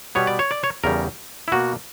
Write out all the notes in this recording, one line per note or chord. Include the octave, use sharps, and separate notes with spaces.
B2 G3 B3 C#5
D5
C#5
D5
C#5
E2 C#3 G3 A#4
E4
B2 A#3 F#4